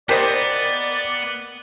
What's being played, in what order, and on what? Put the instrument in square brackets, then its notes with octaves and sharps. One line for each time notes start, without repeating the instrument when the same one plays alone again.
[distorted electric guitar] B3 [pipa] G4 C5 D#5 [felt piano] A#4 [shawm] D5